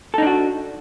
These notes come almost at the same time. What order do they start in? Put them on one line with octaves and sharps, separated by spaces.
A4 D#4 D4 F#4